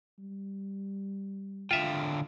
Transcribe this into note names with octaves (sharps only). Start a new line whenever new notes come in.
G3
D3 F4 E5 F5 G5